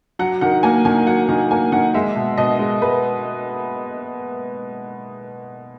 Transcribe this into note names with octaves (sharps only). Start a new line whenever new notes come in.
F#3 F#5
D#3 F#5
A#3 G#5
D#3 G#5
F#3 F#5
D#3 F#5
A#3 G#5
D#3 F#5
G#3 E5
B2
B2 D#5
G#3
G#3 B4